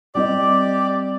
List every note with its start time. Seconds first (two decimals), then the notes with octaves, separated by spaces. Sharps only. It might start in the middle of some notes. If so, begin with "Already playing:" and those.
0.15 G3 C4 G4 D5 D#5